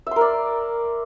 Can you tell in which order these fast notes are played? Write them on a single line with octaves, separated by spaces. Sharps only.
E5 C6 A#4 D5